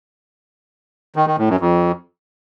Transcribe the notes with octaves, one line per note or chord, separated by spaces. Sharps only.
D#3
D#3
A2
F#2
F2